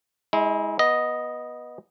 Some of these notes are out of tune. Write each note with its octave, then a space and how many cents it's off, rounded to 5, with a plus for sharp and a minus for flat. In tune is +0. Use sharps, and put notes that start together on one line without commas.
G#3 +0 E4 -35
B3 -15 D#5 +0